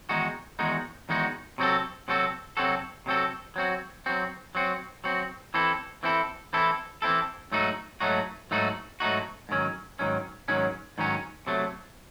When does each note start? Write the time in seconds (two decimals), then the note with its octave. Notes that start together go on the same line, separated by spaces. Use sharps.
0.09 E2 D#3 G#3 D#4 F#4
0.59 E2 D#3 G#3 D#4 F#4
1.09 E2 D#3 G#3 D#4 F#4
1.58 C3 F#3 C4 F#4 A4
2.08 C3 F#3 C4 F#4 A4
2.57 C3 F#3 C4 F#4 A4
3.06 C3 F#3 C4 F#4 A4
3.56 F#3 C4 F#4
4.06 F#3 C4 F#4
4.55 F#3 C4 F#4
5.04 F#3 C4 F#4
5.54 E3 C4 E4 A4
6.03 E3 C4 E4 A4
6.53 E3 C4 E4 A4
7.02 E3 C4 E4 A4
7.52 G#2 F#3 A3 D#4 F#4
8.00 G#2 F#3 A3 D#4 F#4
8.51 G#2 F#3 A3 D#4 F#4
9.00 G#2 F#3 A3 D#4 F#4
9.49 G#2 D#3 F#3 C#4
9.99 G#2 D#3 F#3 C#4
10.48 G#2 D#3 F#3 C#4
10.98 G#2 D#3 F#3 C#4
11.47 C3 F#3 A3